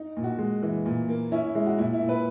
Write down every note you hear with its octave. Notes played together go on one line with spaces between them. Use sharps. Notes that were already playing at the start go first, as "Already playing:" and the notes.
Already playing: D#4
A#2
F#4
G#3
E3
A#2
A#3
C#4 E4
E4
G#3 E4
F#4
A#2 E4
E4
A#2
B4